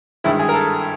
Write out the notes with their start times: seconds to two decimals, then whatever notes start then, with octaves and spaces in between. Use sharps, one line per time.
0.24 G#1 G2 D#3 G#3 E4
0.39 G#4
0.49 A#4
0.54 A4